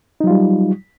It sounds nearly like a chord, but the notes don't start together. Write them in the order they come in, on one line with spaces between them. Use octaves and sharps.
D#4 F#3 F4 G3